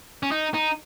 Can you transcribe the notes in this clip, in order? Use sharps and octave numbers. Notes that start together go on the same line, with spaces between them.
C#4
D#4
D#4